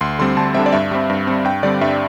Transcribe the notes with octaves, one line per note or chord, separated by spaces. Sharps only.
D2 C6
D3 G3 C4 C6
D2 A5
D3 G3 C4 E5
D5
G2 E5
G3 C4
G2
G3 C4
G2 G5
D3 G3 C4 D5
G2 E5